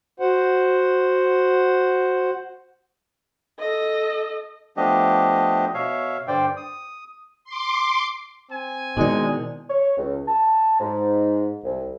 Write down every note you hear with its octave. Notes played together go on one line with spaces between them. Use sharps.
F#4 C5 F#5
A4 D#5
F3 A3 B3 D4 G4 D#5
B2 C#5 E5 F5
G2 D3 G3 C5 D5 G5
D#6
C6 D6
C4 G#5
B2 D#3 G#3 D#4 E4 D5
C#5
C#2
A5
G#2
C2